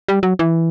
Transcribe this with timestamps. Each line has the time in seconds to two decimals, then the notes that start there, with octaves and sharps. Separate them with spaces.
0.08 G3
0.23 F#3
0.39 E3